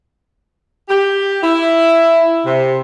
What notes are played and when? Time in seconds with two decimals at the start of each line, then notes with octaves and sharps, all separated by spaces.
0.89 G4
1.43 E4
2.45 C3